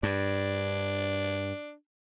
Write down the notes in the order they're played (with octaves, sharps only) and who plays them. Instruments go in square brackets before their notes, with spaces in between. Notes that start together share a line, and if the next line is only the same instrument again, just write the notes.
[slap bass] G2 [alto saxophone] D4